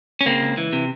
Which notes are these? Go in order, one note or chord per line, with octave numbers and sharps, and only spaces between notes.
C#4
C#3 A#3 C4
C#2
E3
C3